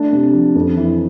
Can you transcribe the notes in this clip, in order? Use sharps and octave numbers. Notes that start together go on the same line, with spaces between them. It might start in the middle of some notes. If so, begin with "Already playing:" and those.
Already playing: A3 D4
C3
F3
F2
E3